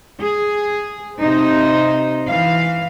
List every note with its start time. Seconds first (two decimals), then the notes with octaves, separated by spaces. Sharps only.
0.21 G#4
1.18 C3 D#4 C5
2.27 E3 F5